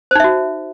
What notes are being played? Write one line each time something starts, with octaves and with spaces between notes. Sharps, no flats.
D#4 F#4 C5 E5